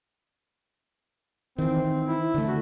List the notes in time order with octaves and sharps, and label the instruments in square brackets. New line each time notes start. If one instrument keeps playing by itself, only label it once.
[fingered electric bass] D#3 E3 [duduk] C4
[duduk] E4
[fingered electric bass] D3 A3
[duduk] F#4